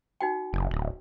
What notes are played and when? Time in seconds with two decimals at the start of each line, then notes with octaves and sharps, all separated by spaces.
0.21 D#4 F#4 G5
0.53 F#1
0.71 D1